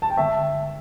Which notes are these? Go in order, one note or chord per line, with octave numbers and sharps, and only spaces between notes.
A5
G5
G1 E5